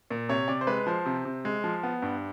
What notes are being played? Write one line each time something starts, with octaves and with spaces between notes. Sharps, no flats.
A#2
C3 C#5
C3 D5
C5
G#3 B4
F3 C5
C3
C3
G#3
F3
B3
G2